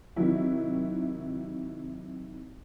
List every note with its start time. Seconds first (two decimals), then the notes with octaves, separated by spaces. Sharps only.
0.16 C3 D#3 F#3 E4